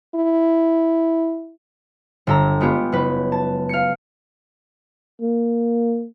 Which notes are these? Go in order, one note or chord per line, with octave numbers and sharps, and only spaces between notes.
E4
G1 A4 A#5
G#3 B3 F4 G4
F#1 B4
A5
F5 C#7
A#3